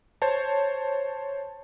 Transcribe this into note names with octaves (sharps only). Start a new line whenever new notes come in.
C5 C#5 A5